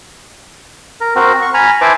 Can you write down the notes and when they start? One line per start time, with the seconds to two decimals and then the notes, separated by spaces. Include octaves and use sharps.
1.01 A#4
1.16 C4 F#4 A#4
1.42 C#6
1.54 G#5 A#5 B5 F6
1.81 E4 B4 C5 G#5 A5 D6